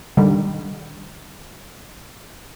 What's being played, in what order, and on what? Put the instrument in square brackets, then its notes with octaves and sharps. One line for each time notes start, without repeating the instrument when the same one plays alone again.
[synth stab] D3 D#3 G3